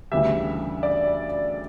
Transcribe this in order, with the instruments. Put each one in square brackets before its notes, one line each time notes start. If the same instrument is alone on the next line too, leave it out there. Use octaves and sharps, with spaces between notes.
[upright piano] D2 C#3 E3 G3 E5
D5